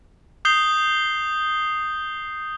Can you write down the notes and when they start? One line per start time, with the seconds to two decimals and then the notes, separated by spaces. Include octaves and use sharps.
0.45 D#6 G6 C7 G7